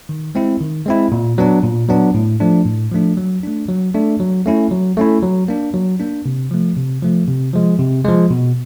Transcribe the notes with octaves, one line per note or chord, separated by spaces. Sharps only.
D#3
G#3 C4 E4
D#3
G#3 C4 E4
A#2
F#3 B3 D4
A#2
F#3 B3 D4
A2
F3 A3 D4
A2
F3 A3 D4
F#3
A3 D4
F#3
A3 D4
F#3
A3 C#4 E4
F#3
A3 C#4 E4
F#3
A#3 D4
F#3
A#3 D4
C3
F3 A3
C3
F3 A3
C3
F3 G#3
C3
F3 G#3
B2